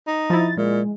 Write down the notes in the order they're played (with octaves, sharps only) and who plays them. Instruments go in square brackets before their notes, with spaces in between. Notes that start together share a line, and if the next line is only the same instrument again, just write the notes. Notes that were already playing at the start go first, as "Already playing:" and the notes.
[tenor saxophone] D#4
[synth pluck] F3 E4 [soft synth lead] A6
[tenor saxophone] A#2 [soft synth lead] G#3